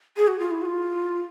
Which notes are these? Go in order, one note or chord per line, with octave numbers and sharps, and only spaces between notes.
G#4
F#4
F4
E4
F#4
F4